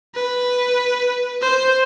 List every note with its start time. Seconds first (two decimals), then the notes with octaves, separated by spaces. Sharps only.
0.15 B4
1.42 C5